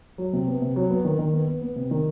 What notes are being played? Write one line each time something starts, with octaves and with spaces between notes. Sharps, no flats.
F#3
C3
B3
C3
F#3
B3
D#3
D#3
B3
B3
B3
C3
D#3